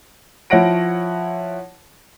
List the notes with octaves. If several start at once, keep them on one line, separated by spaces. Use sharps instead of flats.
F3 E4 C#5 F#5 A#6 D7